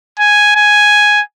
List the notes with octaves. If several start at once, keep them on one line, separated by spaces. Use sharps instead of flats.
G#5
G#5